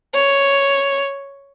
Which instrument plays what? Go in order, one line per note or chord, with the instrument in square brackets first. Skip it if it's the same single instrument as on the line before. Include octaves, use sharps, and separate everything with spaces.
[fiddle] C#5